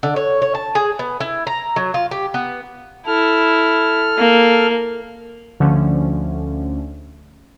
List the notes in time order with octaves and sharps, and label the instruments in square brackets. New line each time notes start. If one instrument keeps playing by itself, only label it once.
[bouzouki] D3
C#5
C#5
A5
G#4
B3
E4
A#5
F#3
F4
G4
B3
[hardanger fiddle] E4 [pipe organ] A4 F6
[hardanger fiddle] A#3
[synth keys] D2 D3 F3 A3 C#4